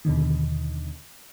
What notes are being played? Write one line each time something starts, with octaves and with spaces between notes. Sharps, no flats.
D#2 B2 D3 D#3